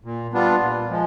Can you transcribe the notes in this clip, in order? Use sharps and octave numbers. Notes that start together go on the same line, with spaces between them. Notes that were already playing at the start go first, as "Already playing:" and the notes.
A#2
G3 B3 D4 F4
A#2
F3 G#3